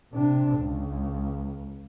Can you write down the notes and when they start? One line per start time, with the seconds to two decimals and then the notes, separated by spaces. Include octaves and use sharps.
0.13 C3 D4
0.58 C#2